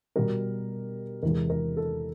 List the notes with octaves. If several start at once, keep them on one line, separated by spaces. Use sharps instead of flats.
B2 G3 A#4
E2 C3 E3 G#3 A#4
A#4
A4